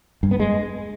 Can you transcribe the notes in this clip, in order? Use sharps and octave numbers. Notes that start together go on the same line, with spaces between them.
G2
B3
G#3